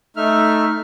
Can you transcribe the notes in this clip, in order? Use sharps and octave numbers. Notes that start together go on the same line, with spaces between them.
A3 D#4 E5 F6